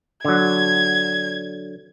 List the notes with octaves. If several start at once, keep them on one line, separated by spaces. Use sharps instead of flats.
D3 F#3 G#6